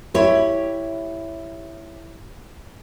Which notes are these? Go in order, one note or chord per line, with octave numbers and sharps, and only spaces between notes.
E4 G4 C#5